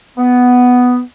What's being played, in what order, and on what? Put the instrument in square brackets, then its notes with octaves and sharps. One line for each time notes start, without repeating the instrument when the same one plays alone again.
[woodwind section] B3